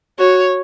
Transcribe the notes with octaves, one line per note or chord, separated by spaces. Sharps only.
F#4 C#5